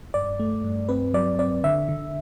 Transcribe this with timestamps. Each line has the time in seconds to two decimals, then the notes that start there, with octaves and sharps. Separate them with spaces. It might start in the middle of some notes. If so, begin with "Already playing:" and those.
0.14 G2 D5
0.39 A3
0.64 G2
0.89 C4 B4
1.14 F#3 D5
1.39 C4 D5
1.64 D3 E5
1.89 D3